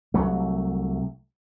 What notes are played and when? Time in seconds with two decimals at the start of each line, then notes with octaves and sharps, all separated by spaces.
0.14 C2 F#3 A3